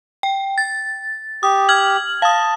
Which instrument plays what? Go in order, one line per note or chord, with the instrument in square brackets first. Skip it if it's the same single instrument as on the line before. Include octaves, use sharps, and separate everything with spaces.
[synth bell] G5
A6
[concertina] G4 [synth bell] D#6
[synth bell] F6 G#6 F#7
[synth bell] F5 D#6 [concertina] A5